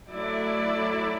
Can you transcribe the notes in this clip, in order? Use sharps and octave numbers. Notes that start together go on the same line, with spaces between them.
F#3 A3 E4 D5